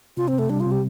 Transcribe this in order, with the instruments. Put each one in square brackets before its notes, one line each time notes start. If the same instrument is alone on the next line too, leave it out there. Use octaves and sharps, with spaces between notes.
[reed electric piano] C3 [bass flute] F4
[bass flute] C4
[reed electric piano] C3
[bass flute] A3
[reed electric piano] G3 [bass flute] D4
[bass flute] F4
[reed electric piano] C3
[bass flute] G4